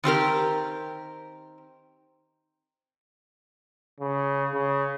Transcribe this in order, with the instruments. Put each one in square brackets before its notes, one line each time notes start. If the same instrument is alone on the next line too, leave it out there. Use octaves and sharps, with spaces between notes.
[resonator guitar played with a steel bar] D#3 C4 G4 A#4
[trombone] C#3
C#3